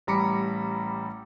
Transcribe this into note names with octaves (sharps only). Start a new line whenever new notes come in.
A1 G3 A#5 B5 D6 C#7